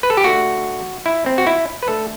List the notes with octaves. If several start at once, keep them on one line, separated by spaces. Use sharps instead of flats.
B4
A4
G4
D3 A3 F#4
E4
C4
F#4
E4
B4
D3 A3 A4